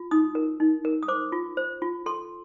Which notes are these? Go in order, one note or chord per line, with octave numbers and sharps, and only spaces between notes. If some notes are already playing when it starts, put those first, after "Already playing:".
Already playing: F4
D#4 D#6
A#4
D#4
A#4
D#6
C5 D6
F4
C5
F4
A4 C6